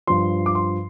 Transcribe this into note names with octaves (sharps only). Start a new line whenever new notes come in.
G2 F3 C6
D6
C6